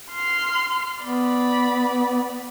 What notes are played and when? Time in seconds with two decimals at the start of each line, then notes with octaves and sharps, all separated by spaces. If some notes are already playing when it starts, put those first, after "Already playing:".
0.12 C6 F6
1.02 B3 D5 B5